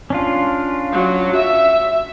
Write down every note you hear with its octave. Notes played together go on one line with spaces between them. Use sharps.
C#4 D4 F4
F#3
E5